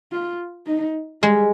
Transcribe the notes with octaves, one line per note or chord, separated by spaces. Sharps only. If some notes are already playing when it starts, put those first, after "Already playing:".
F4
D#4
G3 G#3